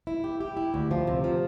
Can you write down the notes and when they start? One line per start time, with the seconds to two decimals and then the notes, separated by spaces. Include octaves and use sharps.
0.07 E4
0.24 G4
0.40 G4
0.57 E4
0.74 D2
0.91 F3
1.07 C3
1.24 F3